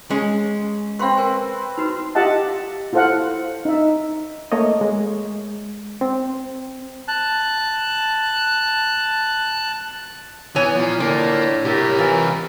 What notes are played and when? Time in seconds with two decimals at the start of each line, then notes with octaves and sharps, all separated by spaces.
0.10 G#3 C#4
0.99 C4 B4 F5 C6 C#6
1.17 A#4 G#5
1.78 D#4 F#4 B4
2.15 F4 G4 D#5 E5 F#5 A5
2.93 E4 F4 A4 C5 F5 F#5
3.65 D#4 E5
4.52 A3 A#3 C#5 D#5
4.81 G#3
6.01 C4
7.08 A5 F#6
10.56 E3 B3 C#5 G#5
10.75 A#2 F3
11.00 A2 D3 A#3
11.65 A2 C3 G4 A#4
11.99 E3 F4